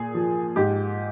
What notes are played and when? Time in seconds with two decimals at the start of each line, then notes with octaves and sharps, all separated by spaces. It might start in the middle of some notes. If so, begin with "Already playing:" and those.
Already playing: A#2 G#4
0.14 F3
0.56 G#2 G4